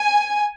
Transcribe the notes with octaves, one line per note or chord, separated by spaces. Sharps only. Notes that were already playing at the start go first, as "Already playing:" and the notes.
Already playing: G#5